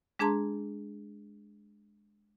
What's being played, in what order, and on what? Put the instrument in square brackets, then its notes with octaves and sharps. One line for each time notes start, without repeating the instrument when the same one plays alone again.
[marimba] G#3 D4 G#4 A5 A#5 C6